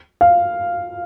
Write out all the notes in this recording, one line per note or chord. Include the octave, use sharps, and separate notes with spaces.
F5